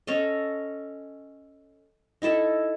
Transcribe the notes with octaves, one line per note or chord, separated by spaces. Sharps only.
C#4 A4 D#5
D#4 E4 A4 E5